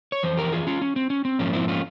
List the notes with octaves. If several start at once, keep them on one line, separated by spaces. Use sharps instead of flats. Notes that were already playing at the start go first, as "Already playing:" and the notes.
C#5
F2 E3 C5
G4 A#4
F4 G#4
C#4 F4
C#4
C4
C#4
C4
G#2 F3 A#3 C#4
C4 E4
C#4 F4